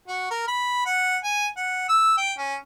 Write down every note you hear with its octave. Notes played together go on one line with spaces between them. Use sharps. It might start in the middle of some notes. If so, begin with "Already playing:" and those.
F#4
A#4
B5
F#5
G#5
F#5
E6
G5
C#4